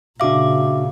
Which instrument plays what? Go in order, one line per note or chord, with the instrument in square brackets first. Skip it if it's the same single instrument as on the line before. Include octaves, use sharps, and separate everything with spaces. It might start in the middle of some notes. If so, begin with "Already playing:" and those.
[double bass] A#2 C#3 [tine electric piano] D4 F#4 F5 [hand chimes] E5 D6